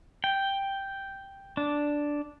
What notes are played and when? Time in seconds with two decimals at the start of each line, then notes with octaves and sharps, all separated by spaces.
0.24 G5
1.57 D4